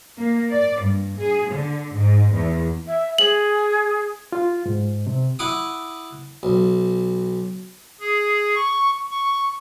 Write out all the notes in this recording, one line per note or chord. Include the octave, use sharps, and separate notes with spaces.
A#3
D5
G2
G#4
D3
G#2
E2
E5
G#4 F#7
F4
G#2
C3
E4 F#5 D6 D#6
B1
G#4
C#6
C#6